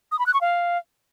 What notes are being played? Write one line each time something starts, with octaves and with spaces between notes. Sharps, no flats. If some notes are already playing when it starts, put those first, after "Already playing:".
D#6
B5
F#6
C#6
F5